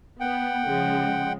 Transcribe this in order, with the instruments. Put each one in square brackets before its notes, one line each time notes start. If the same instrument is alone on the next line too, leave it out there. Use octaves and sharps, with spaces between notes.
[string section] B3 [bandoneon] F#5 G5
[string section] C#3 F3 G#3